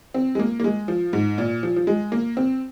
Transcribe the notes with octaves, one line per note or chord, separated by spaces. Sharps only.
C4
G#3
A#3
A#3
G#3
F3
G#2
A#2
F3
F3
G#3
A#3
C4